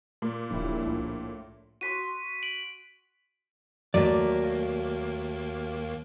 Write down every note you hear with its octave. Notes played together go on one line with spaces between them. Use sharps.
A#2
D1 A#1 C#3 G3 E4
C2 A2
F#4 C6 D#6 B6 D#7
D7 F#7
D#2 F#3 A3 A#3 D5